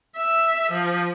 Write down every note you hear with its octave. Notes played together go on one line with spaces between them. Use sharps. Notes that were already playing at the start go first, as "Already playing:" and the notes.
E5
F3